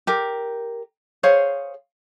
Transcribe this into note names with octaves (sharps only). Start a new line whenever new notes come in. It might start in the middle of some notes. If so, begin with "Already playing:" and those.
G4 A#4
G#4 C5 C#5 F5